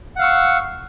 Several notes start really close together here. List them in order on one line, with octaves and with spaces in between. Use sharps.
F#5 F5 E6 C#6